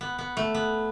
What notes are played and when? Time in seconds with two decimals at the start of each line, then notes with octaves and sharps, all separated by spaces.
0.01 B3
0.19 B3
0.37 A3
0.55 B3